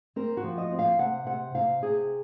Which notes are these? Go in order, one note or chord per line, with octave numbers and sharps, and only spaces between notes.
C4 A#4
F#4
F3
D#5
C4
F5
C3 F#5
C3 F#5
C3 F5
C3 G#4